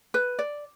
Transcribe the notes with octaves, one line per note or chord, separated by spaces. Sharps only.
B4
D5